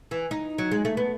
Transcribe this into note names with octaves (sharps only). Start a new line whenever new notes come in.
E3
D#4
F#3
G#3
A3
B3